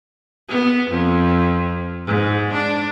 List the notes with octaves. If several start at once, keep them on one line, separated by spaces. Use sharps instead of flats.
B3
F2
G#2
D4